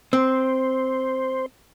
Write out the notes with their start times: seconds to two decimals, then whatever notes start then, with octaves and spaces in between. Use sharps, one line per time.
0.13 C4 C5